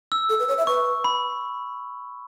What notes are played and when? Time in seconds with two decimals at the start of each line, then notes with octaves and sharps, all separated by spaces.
0.12 E6
0.29 A4
0.40 B4
0.48 C#5
0.58 E5
0.67 B4 C#6
1.04 B5